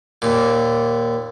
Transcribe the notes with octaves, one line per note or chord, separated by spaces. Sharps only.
D#2 A#2